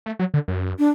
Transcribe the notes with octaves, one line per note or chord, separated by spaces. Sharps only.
A3
F#3
D3
F#2
D4